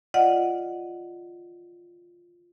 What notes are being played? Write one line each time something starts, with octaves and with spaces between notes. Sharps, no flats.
F4 D5 D#5 F#5